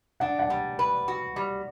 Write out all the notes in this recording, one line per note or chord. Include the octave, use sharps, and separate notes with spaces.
D4 F#5
F#5
G3
B4
F#4
G3